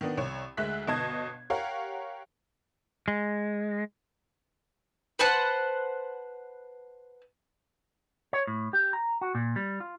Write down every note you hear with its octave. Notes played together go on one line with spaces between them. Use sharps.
D#3 B3 D4
C2 C#5
D2 G#3 E5 F#6 B6
G1 B2 D#5 A5 D#6 G#6
G4 A#4 C#5 F5 F#5
G#3
B4 C5 F#5 A5
C#5
A2
G4
A#5
F#4
A#2
G3
F4